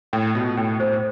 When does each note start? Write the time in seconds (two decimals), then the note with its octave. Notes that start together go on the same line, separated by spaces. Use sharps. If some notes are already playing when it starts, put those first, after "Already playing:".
0.13 A2 G5
0.35 B2 F4
0.57 A2 G5
0.80 A2 C5